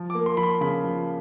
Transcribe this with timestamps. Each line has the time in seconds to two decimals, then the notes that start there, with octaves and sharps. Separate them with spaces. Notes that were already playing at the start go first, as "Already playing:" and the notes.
Already playing: F3
0.10 D6
0.15 A#3
0.26 C6
0.37 F3 B5
0.43 C6
0.61 C#3 B5
0.84 F3